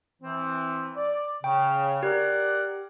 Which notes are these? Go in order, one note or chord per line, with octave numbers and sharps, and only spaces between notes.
E3 C4
D5
C#3 G5
G4 A#4 D5 F#5